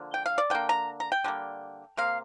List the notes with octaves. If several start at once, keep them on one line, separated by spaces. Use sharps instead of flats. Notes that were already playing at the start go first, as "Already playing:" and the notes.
Already playing: D3 F3 A#3
G5
F5
D5
D3 A#3 G5
A#5
A#5
G5
D3 G3 A#3
C3 A#3 F5